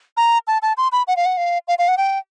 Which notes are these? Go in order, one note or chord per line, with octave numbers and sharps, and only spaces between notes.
A#5
A5
A5
C6
B5
F#5
F5
F#5
F5
F5
F5
F#5
G5